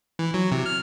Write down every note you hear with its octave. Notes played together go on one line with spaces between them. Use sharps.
E3
F#3
C3
F6